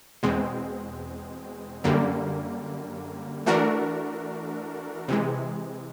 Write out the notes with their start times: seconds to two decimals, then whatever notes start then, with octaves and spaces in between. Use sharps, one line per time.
0.23 E2 B2 G#3 C4
1.84 F#2 D3 G3 A#3
3.46 E3 A3 D4 F#4 A#4
5.08 C3 E3 G#3